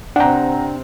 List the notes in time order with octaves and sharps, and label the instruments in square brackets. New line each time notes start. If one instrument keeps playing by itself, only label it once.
[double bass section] C3 C4 [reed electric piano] D4 G5 [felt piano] F#5 A#5